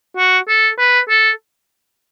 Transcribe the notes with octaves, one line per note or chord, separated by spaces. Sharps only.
F#4
A4
B4
A4